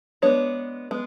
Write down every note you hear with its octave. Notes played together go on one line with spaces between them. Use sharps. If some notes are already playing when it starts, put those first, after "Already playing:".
G#3 B3 D4 C#5
G#3 B3